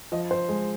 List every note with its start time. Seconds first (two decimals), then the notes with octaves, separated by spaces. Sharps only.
0.12 F3 D#5
0.31 C5
0.49 G#3